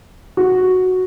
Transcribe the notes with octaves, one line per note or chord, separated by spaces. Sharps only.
F#4